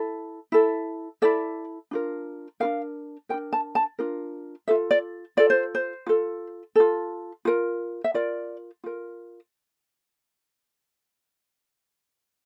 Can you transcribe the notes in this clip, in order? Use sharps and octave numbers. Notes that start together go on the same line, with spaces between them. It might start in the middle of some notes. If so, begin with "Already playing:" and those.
Already playing: E4 A4
E4 A4
E4 A4 D5
D4 F4 A#4
D4 F4 A#4 F5
D4 F4 A#4 G5
A5
A5
D4 F4 A#4
F4 A4 E5
D5
F4 A4 D5
C5
C5
F4 A4
F4 A4
F4 A#4
E5
F4 A#4 D5
F4 A#4